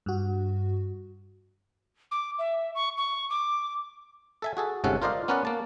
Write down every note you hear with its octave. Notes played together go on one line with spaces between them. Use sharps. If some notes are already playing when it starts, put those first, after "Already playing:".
G2 F#4
D6
E5
C#6
C#6
D6
A4 E5 G#5
F#4 G#4 A4
G1 G#2 C3 C#4 A4 F#5
F4 A#4 C5 D5 D#5 F5
B3 C#4 A#4 B4 D5 F#5
A#3 A5